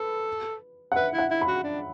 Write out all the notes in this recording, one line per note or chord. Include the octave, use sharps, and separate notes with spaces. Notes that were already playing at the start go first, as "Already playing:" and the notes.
Already playing: A4 B4
F#5
B4 E5
E4 F#5
E4
B5
F#4
D4